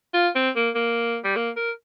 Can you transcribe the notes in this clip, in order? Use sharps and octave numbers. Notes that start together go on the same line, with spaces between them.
F4
C4
A#3
A#3
G3
A#3
A#4